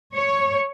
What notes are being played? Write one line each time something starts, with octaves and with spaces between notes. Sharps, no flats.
C#5